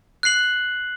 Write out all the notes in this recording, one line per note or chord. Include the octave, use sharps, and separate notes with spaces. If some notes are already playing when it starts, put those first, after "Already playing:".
F#6 C7 F#7